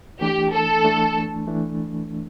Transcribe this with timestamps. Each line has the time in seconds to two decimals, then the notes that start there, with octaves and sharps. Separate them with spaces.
0.21 E3 A3 D4 G4
0.53 A4
0.84 E3 A3 D4
1.47 E3 A3 D4